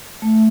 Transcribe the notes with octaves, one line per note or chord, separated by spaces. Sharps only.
A3